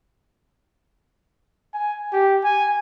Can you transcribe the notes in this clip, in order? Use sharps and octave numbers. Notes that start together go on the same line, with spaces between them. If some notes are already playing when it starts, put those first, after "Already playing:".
G#5
G4
G#5